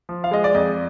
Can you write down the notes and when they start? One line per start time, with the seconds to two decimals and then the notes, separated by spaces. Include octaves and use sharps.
0.09 F3
0.24 F5
0.31 G#3 D#5
0.44 D5
0.55 F2 D#5